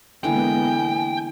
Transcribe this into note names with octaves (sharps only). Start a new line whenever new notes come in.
D3 E3 G#3 A#3 B3 G5 G#5